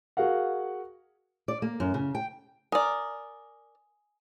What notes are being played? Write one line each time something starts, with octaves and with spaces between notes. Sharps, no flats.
F#4 G#4 A#4 F5 F#5
D5
A#3
F#2
C#3
G5
A#4 D5 G#5 D#6